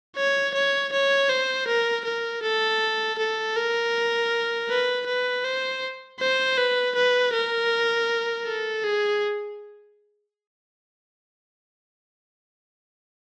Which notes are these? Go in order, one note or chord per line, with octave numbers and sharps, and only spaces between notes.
C#5
C#5
C#5
C5
A#4
A#4
A4
A4
A#4
B4
B4
C5
C5
B4
B4
A#4
A4
G#4